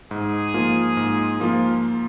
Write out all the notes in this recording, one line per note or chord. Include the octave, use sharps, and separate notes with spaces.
G#2 G#4
F3 A#3 F4
G#2
F3 A#3 F4